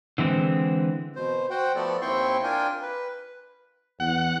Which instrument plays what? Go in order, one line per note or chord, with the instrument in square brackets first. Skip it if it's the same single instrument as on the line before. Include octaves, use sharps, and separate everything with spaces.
[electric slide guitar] D3 E3 G#3 C4
[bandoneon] B2 C5
F#4 C5 F#5 G5
F3 A3 B3 A4 D5
D#2 C4 E4 G5 C6 C#6
D4 F4 A#4 G5 G#5
B4
[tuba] E2 [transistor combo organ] F#5